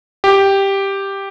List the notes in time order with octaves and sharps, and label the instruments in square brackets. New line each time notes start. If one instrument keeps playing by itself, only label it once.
[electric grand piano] G4